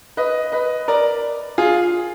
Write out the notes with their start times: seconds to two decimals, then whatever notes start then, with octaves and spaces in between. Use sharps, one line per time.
0.17 B4 D#5
0.52 B4 D#5
0.88 A#4 D5
1.58 F4 G#4